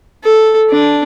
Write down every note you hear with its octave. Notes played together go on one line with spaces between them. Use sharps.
A4
D4